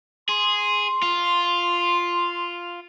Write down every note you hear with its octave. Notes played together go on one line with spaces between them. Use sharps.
G#4 C6
F4